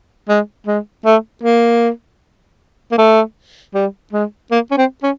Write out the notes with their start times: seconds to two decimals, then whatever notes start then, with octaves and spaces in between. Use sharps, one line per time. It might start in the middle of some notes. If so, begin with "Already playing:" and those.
0.29 G#3
0.67 G#3
1.05 A3
1.43 A#3
2.92 A#3
2.98 A3
3.74 G3
4.13 G#3
4.52 A#3
4.71 C#4
4.77 C4
5.03 C#4